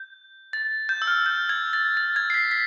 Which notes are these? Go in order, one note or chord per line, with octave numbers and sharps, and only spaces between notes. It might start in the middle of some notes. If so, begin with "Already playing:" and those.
Already playing: G6
A6
G6
E6
F6
G6
G#6
A6
A6
G#6
C7
B6
B6